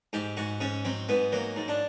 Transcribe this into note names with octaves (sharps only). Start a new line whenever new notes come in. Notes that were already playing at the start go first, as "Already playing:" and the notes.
G#2 G4
G#2 F#4
G#2 C#4
F#3 C4
G#2 B3
F#3 A#3
G#2
D4